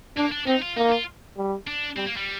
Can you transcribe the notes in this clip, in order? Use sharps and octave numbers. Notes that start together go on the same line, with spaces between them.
A#3 D4
D4
C4 D#4
F4
A#3 D#4
F4
G3
D4
G3 C4
A#3
G3